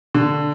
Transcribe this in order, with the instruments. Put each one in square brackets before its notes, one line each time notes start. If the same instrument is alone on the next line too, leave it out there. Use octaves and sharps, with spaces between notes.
[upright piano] D3